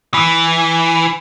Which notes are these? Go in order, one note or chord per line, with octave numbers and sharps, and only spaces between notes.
E3